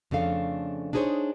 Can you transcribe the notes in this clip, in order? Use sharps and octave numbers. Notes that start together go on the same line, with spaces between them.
F2 C#3 A3 D4 A4 F5
D4 D#4 G#4 A4 C5 C#5